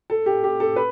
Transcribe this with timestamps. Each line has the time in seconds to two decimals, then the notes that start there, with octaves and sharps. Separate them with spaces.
0.10 A4
0.26 G4
0.44 G4
0.60 A4
0.76 B4